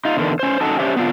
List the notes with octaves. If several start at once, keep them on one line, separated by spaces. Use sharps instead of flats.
D#4 F4
E2 D3 D#3
C#4 C5
C#4 D#4 F#4 A4 A5
C#4 D4 G4 C5 E5
B3 C4 D4 E4 F4